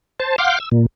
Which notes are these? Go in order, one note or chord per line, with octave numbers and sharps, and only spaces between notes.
C5 A5
F5 F#5 C6 D6 F6 G6
E6
A#2